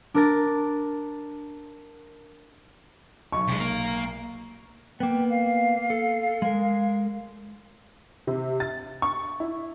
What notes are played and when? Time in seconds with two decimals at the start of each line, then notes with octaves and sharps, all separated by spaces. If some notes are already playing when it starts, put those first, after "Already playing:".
0.14 D4 A#4 A6
3.32 B1 C#6
3.47 C3 G#3
3.60 A#3
5.00 A#3 B3 G5
5.30 F5
5.90 A4
6.42 G#3 A#4
8.27 C3
8.60 A6
9.02 C#6
9.40 E4